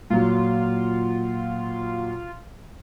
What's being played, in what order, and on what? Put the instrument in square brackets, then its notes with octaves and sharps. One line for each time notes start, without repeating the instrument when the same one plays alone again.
[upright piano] A#2 F#3 [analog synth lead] F4